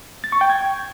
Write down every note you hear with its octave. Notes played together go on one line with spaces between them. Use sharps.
A6
C#6
G5
G#6